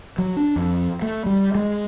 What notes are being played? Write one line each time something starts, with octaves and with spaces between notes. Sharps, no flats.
F#3
D4
F2
A3
G3
G#3